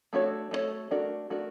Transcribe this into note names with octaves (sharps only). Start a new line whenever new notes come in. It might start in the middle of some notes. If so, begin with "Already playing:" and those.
A3 D4 F#4 A4 C#5
A3 D4 F#4 A4 C#5
A3 D4 F#4 A#4 D5
A3 D4 F#4 A#4 D5